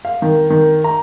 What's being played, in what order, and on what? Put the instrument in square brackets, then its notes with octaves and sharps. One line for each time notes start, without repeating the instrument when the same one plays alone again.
[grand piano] F5
D#3
D#3
A#5